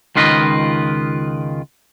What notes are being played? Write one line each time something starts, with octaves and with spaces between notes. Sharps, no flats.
C#2 D#3 F4 B4 D#5